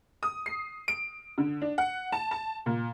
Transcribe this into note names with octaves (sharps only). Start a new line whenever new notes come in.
D#6
C7
D7
D3
D4
F#5
A5
A5
A#2